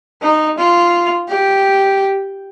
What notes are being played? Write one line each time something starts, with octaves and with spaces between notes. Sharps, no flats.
D#4
F4
G4